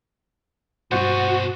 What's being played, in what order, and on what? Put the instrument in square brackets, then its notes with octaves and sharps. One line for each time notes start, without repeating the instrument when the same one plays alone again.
[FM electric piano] G2 C#6 A6 [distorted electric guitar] B2 G#4 [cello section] F#4 [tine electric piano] C5 F#5